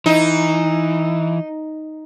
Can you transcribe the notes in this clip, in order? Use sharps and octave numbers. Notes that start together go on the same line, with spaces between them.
E3 D#4